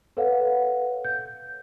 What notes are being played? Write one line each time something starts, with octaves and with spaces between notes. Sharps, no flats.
A4 B4 C#5 F5 F#5
G6